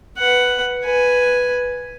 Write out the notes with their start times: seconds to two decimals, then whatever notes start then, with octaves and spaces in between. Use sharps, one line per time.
0.18 B4 F#5
0.84 B4 G#5